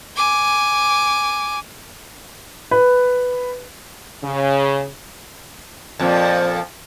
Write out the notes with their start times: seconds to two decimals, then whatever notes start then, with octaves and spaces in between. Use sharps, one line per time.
0.16 G#5 D6
2.71 B4
4.24 C#3
5.99 F2 A#2 F3